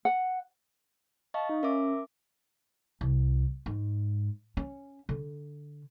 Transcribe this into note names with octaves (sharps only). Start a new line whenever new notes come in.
F#5
D#5 F5 A5 C#6
D#4
C#4 A#4 E5 D6
C2
G#2
C#4
D3